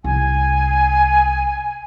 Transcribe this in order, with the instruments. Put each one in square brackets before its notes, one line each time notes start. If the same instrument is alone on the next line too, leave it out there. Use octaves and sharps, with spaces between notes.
[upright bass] C2 [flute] G#5